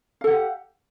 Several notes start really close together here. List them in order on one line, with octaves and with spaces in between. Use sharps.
F5 A4 F#5 G4